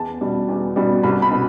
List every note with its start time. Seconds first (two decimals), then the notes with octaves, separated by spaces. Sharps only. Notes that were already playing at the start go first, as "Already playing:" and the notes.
Already playing: E2 A5
0.21 B2 G3
0.49 E2
0.76 B2 G3
1.03 C2 B5
1.22 B5
1.32 B2